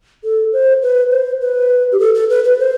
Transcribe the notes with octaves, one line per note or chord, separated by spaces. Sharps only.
A4
C5
B4
C5
B4
G4
A4
A4
B4
B4
C5